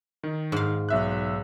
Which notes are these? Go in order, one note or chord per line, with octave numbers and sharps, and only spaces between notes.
D#3
G#2 F5
B1 E5 F#6